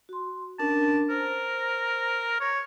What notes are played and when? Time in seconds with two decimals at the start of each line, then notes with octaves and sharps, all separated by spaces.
0.09 F#4 C6
0.59 C#4 D4 A#4 A5
1.10 A#4 C5
2.41 C#5